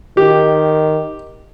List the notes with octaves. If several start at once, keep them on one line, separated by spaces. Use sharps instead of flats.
D#3 G4